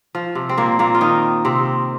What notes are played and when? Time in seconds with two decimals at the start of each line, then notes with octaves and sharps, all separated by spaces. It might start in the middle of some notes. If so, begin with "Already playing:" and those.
0.15 F3
0.35 C3
0.49 C4
0.57 A#2 A#3
0.79 A#2 A#3
0.95 F4
1.01 D#3 D#4
1.45 C3 C4